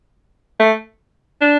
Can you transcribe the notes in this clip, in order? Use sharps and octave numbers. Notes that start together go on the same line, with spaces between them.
A3
D4